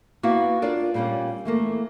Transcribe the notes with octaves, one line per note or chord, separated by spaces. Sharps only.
A#3 B3 E4 F#4 B4 F#5
D4 F4 A#4 D5
A#2 G3 A#3 C4 C#4
E3 A3 A#3